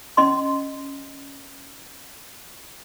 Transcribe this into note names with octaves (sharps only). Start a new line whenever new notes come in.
C#4 D#5 C6